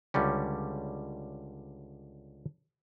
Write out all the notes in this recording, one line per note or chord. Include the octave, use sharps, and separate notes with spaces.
C#2 D3 G3 C#4